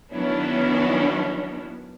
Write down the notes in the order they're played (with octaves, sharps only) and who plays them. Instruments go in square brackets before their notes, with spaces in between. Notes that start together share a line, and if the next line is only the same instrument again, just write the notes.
[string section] D#3 F#3 B3 C#4 D4 E4